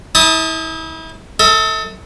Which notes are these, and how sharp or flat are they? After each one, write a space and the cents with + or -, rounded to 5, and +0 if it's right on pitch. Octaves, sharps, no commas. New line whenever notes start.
E4 -35 A5 +0 D#6 +0
A4 +25 E5 -45